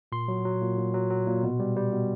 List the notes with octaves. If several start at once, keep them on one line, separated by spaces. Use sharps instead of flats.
A#2 C6
F#3
F#3
A#2
A#2
F#3
F#3
A#2
B2
G3
G3
B2